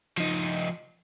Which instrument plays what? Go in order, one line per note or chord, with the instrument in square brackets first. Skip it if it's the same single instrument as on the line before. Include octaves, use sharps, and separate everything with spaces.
[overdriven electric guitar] F3 D#4